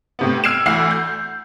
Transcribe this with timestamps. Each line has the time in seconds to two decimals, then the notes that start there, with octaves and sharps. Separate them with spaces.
0.19 A2 C3 B3
0.44 E6 F6 G#6 C7 D7 E7
0.66 D2 E3 F#5 E6 C7
0.91 G6